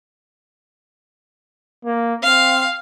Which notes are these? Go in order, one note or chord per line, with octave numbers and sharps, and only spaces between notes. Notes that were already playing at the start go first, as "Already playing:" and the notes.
A#3
C4 F5